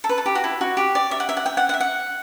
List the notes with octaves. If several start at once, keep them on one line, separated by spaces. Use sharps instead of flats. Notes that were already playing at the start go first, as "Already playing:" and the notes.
A4
B4
A4
G4
F#4
E4
F#4
G4
D5
E5
F#5
E5
F#5
G5
F#5
F#5
E5
F#5